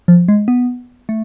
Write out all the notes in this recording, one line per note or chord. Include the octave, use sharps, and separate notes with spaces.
F3
G#3
B3
A3